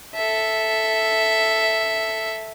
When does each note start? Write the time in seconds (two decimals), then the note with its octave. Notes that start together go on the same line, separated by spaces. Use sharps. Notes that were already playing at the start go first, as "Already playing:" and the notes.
0.15 A4 E5